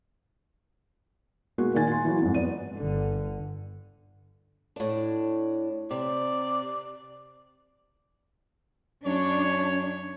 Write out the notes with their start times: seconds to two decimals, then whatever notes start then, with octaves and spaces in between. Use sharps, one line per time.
1.58 B2 G#3 A#3 F#4 G#4
1.74 A#2 D#3 D#4 F4 G#5 A6
1.88 G#5 C6
2.05 E3 F#3
2.21 F2 G#2
2.34 B3 D5 D#7
2.77 G1 D3
4.76 A2 D4
5.91 C3 D5
9.06 F#2 D4 C#5